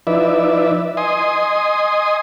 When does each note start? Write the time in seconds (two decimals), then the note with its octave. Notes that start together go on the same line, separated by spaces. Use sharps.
0.07 F3 D#4 E4 B4 D5 E5
0.97 D#5 G#5 C6 D#6